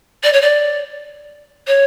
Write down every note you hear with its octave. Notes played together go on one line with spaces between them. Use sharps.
D5
C#5
D5
C#5